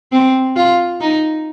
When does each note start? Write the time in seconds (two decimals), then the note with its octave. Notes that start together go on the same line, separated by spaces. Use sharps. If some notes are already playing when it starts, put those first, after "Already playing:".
0.12 C4
0.56 F4
1.01 D#4